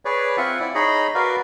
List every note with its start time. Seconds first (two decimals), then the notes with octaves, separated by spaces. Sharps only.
0.05 G#4 B4 C#5 D5
0.37 C4 F4 E5 F#5 G#5
0.60 E4 D5
0.75 D#4 G#4 C#5 D#5 B5
1.15 F#4 A#4 B4 D5 F5